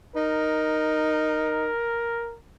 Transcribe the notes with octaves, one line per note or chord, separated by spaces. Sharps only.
D#4 A#4